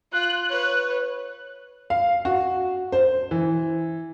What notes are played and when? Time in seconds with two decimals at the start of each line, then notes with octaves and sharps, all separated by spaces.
0.13 F4 F#6
0.50 B4 C#5
1.90 F5
2.25 F#4
2.92 C5
3.31 E3